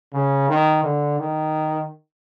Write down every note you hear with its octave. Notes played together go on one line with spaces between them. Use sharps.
C#3
D#3
D3
D#3